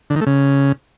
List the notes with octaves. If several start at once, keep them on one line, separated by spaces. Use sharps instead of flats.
D3
D#3
A3
C#3